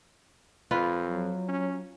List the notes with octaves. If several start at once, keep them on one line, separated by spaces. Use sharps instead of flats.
F2 F4 B4
F#3
C#4